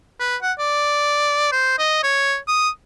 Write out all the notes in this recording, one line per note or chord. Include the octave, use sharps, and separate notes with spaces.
B4
F#5
D5
C5
D#5
C#5
D#6